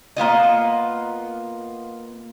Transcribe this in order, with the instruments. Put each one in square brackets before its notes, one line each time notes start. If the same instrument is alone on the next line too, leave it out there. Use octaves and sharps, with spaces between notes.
[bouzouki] A#3 B3 F4 D#5